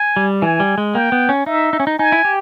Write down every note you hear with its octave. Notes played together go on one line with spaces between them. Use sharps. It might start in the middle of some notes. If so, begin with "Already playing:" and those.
Already playing: G#5
G3
E3 G#5
G3
G#3
A#3 G5
B3
C#4
D#4 E5
D#4
C#4
D#4
D#4 G#5
E4
G4